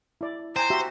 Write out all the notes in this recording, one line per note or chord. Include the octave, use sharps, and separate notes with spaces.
E4 D5
C5 G5 G#5 A#5
F#4 G4 E5